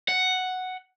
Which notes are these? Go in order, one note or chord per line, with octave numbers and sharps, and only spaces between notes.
F#5